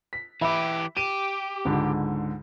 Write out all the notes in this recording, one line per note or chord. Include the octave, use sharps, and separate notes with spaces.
B6
E3 G4 E5 B5
G4 D#7
C#2 G#2 D3